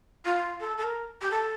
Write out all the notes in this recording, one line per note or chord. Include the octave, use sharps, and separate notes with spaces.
F4
A4
A4
A#4
G4
A4